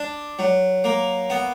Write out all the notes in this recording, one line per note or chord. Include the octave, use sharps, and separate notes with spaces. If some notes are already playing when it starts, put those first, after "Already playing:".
Already playing: D4
F#3
A#3
B3